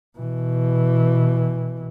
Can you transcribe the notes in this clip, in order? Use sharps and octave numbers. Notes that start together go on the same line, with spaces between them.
B2 E3